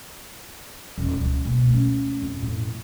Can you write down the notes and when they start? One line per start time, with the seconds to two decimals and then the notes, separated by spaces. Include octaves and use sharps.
0.98 D#1 E2
1.21 C#2
1.45 B2 A#3
1.69 A3 C#4
2.22 F2
2.42 A2